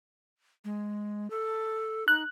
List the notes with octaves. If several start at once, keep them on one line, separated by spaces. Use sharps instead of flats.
G#3
A4
D#4 F#6